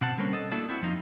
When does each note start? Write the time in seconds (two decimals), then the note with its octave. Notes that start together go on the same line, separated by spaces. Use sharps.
0.01 B2 C4 F#5 A5
0.17 D3 G3 A#3 C4 C#4
0.33 A4 D#5
0.52 A3 A#3 D4 E4 F#4 A4
0.68 C4 E4 F#4
0.82 F2 F3 D#4 F4